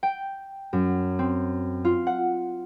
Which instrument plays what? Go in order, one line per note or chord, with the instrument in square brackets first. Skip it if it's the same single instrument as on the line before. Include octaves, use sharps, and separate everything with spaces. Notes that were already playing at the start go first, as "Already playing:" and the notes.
[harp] G5
F#2
C4
F4
F#5